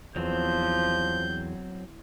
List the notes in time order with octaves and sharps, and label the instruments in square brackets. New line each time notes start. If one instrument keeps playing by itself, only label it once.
[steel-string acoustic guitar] E2 [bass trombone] F3 [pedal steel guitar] F#3 C4 [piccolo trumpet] G6